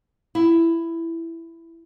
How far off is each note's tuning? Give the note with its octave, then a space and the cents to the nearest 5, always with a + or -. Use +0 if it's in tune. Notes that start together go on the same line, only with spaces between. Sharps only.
E4 +10